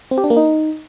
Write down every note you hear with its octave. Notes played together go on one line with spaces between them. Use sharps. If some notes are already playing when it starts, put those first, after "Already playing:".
C4
G4
D4
A#3
D#4